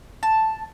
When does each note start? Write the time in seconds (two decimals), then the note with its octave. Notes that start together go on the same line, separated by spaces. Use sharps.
0.23 A5